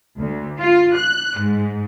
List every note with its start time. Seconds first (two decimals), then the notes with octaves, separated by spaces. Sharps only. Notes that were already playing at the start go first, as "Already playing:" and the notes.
0.18 D2
0.60 F4
0.95 F#6
1.39 G#2